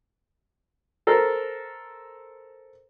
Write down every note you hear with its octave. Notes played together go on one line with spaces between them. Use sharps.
A4 A#4 C5